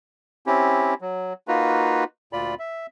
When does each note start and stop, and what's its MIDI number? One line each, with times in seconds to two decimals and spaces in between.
0.46 0.94 60
0.46 0.94 61
0.46 0.94 64
0.46 0.94 67
1.01 1.33 54
1.48 2.04 58
1.48 2.04 63
1.48 2.04 65
1.48 2.04 66
1.48 2.04 71
2.33 2.55 38
2.33 2.55 46
2.33 2.55 65
2.33 2.55 74
2.33 2.55 83
2.59 2.87 76